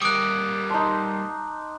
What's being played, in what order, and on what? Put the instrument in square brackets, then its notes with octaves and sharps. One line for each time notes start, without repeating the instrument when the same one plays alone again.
[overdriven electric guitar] G3 A#3 [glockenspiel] D6 F#6 [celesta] D#6 D7
[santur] D#4 C6 [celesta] A5